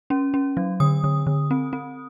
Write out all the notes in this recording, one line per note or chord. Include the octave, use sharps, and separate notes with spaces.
C#4
C#4
F#3
D3 D#6
D3
D3
C4
C4